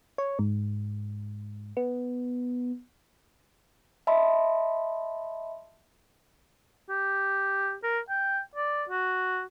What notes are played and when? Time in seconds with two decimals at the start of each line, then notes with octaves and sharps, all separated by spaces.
0.18 C#5
0.39 G#2
1.77 B3
4.07 D#5 E5 A5 B5 C6
6.90 G4
7.83 A#4
8.09 G5
8.55 D5
8.89 F#4